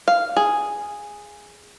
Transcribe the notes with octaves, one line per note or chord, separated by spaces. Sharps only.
F5
G#4